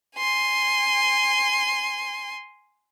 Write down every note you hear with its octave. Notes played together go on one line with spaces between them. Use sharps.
G#5 C6